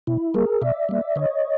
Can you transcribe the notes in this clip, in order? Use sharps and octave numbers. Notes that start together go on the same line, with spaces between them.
B2 E4
G3 A#3 G#4 A#4
B2 D5 E5
G3 A#3
D3 C#5 D#5